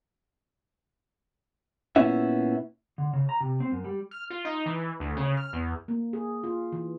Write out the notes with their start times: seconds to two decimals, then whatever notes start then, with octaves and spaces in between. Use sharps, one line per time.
1.96 A#2 B3 C#4 E4 E5
2.98 D3
3.13 C#3
3.29 A#5
3.41 C3
3.60 C4
3.72 F#2
3.84 G3
4.11 F6
4.30 F4
4.45 D#4
4.66 E3
5.00 D2
5.17 C#3
5.37 F6
5.53 E2
5.88 A#3
6.13 G#4
6.44 F4
6.72 E3